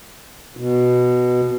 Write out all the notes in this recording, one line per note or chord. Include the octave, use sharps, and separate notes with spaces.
B2